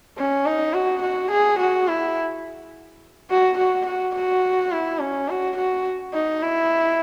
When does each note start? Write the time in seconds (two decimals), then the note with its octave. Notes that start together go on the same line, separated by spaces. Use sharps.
0.18 C#4
0.46 D#4
0.74 F#4
1.02 F#4
1.31 G#4
1.59 F#4
1.88 E4
3.30 F#4
3.58 F#4
3.86 F#4
4.15 F#4
4.72 E4
5.01 C#4
5.29 F#4
5.57 F#4
6.14 D#4
6.43 E4